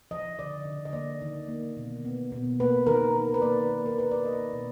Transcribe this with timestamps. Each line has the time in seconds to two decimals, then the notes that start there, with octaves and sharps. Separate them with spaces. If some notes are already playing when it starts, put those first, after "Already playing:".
0.11 F3 D#5
0.39 D3 D5
0.66 D3
0.85 D#5
0.93 A#3 D5
1.22 D#3
1.48 A#3
1.77 B2
2.05 B3
2.32 B2
2.60 A#3 B4
2.87 D#3 A#4
3.15 D#3
3.34 B4
3.42 A#3 D5
3.69 A#3
3.86 A#4
3.97 D#3 B4
4.11 D5
4.25 A#3 D#5
4.53 B2